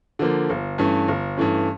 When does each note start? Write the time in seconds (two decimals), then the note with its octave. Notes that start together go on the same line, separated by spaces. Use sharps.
0.19 D3 F3 A#3
0.50 G1
0.78 G2 E3 A3 C#4
1.08 G1
1.37 G2 E3 A3 C#4